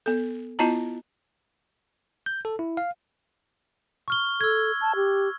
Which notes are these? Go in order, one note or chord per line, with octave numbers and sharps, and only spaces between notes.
B3 A4
B3 E4 F4 D#5 A5 A#5
G6
A4
E4
F5
C#6 F6 G7
A4 E6 G#6
A5
G4